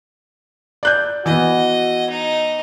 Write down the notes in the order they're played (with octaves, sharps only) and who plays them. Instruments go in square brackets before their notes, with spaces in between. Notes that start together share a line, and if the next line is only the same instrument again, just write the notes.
[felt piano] D5 F#6 G6
[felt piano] E3 B3 [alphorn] F#4 [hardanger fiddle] D#5
[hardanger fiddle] D#4